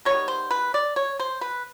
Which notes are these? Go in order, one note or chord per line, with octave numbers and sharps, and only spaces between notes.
D#3 G3 B3 C#5
C5
B4
D5
C#5
C5
B4